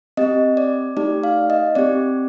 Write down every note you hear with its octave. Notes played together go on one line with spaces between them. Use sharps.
C4 G4 D#5
D5
A3 D#4 G4 D5
F5
D#5
C4 G4 D5